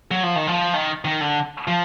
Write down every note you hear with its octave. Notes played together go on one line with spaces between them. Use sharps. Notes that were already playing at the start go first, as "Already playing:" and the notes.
F#3
F3
D#3
F3
D#3
D#3
D3
F3